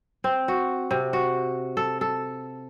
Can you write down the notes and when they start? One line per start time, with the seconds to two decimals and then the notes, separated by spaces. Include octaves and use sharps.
0.24 C4
0.48 F#4
0.91 C3
1.13 F#4
1.77 A4
2.01 A4